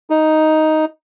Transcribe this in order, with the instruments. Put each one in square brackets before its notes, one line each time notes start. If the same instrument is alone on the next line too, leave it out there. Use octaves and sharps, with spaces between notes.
[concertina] D#4